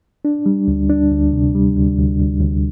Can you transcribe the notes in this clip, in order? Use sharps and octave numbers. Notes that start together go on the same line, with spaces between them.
D4
G3
D2
D4
D2
C3
G3
D2
D2
D2
D2